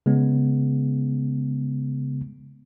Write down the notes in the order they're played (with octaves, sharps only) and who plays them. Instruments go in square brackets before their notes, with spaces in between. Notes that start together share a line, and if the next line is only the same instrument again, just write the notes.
[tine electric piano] C#3 G#3 B3